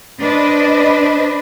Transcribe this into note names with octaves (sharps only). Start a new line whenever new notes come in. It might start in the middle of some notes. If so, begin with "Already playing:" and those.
D4 B4 C5 D#5